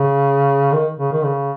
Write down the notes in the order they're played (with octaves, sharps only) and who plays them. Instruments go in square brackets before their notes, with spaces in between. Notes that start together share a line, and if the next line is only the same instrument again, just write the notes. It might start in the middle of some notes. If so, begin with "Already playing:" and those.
Already playing: [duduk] C#3
D#3
C#3
D#3
C#3